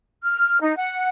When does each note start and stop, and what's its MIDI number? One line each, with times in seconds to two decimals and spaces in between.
0.23 0.59 89
0.61 0.74 63
0.76 1.08 78